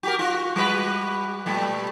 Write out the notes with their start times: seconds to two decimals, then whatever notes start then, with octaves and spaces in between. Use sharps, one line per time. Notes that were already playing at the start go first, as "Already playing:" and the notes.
0.03 F#4 G4 A#4
0.19 F4 F#4
0.56 G3 F#4 B4
1.46 A#2 G3 A3